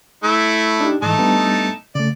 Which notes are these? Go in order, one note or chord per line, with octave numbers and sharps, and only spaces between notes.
A3 E4
D4 D#4 G4
G#2 E3 A3 D#4 A5
G3 B3 D4
C#3 A3 D5